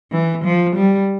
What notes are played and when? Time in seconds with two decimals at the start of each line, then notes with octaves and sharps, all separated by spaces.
0.11 E3
0.44 F3
0.76 G3